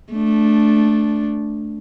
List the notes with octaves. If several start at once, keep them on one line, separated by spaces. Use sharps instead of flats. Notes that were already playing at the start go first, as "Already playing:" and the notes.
A3 D4